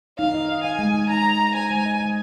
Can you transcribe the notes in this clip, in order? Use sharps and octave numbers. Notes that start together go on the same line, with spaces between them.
D#4 F5
D#5
D#5
D#5 G#5
G#3
D#4
D#4 A#5
G#3
D#5
C5 G#5
G#3
D#5
G#3